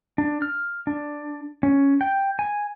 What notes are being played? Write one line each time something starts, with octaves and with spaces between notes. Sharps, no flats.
D4
F6
D4
C#4
G5
G#5